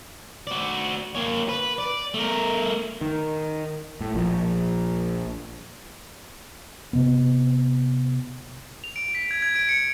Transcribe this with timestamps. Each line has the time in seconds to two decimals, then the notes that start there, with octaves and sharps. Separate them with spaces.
0.47 F#4 D5
1.15 A#3 C#5
1.49 B4
1.78 D5
2.14 A3 A#4
3.01 D#3
4.01 A2
4.15 A#1 F3
6.93 C3 B3
8.84 F7
8.96 D7
9.15 B6
9.31 G#6
9.42 G#6
9.55 D7
9.69 C#7